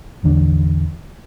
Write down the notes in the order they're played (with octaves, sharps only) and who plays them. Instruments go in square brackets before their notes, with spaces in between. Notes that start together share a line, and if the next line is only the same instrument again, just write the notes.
[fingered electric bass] A1 E2 D3